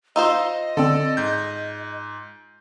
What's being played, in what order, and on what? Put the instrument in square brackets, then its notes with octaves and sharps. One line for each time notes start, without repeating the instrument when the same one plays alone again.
[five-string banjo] D#4 F4 C5 [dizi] D#5 [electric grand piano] E6
[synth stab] D3 C4 [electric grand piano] A4 D5 E6
[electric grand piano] G#2 G6